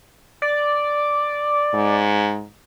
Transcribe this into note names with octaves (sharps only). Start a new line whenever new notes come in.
D5
G#2